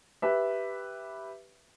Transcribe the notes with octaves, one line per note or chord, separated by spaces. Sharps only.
G4 B4 E5